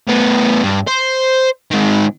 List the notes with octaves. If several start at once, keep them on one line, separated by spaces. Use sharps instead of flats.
A2 B3
G2
C5
D#3 G#3